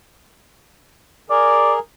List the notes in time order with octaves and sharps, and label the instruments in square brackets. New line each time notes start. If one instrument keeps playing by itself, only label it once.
[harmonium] G#4 A#4 [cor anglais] D5